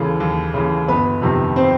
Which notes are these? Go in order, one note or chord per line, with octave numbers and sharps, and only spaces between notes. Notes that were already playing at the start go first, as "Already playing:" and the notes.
Already playing: D#2 C#3 E3 A4
D#2
C#3 E3
G1 B3 B4
F2 C3 D#3
C4 C5